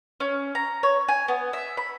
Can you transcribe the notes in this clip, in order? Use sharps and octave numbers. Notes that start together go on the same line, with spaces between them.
C#4
A#5
C#5
G#5
B3
E5
B5